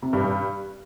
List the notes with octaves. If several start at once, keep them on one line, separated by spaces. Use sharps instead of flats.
C3
G2
G2